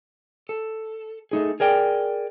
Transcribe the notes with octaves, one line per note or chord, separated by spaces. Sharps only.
A4
A3 D#4 G#4
G#4 A#4 D5 G5